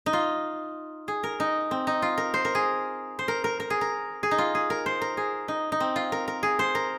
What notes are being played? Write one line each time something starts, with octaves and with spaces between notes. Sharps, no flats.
D#4
F4
G#4
A#4
D#4
C4
D#4
F4
A#4
C5
A#4
G#4
C5
A#4
A#4
A#4
G#4
A#4
G#4
D#4
F4
G#4
A#4
C5
A#4
G#4
D#4
D#4
C4
F4
A#4
A#4
G#4
C5
A#4